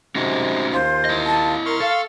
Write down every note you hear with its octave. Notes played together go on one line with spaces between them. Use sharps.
C3 G#3 C#4 D#4 F#4
D#2 F4 C5
E4 D#5
A5
A#4 C6 C#6 F6
A4 F5